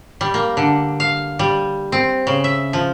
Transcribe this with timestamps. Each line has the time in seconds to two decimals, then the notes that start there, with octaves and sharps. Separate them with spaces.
0.21 G3
0.34 A#3
0.57 D3
1.00 F5
1.39 G3
1.92 C4
2.27 C#3
2.44 E5
2.73 F3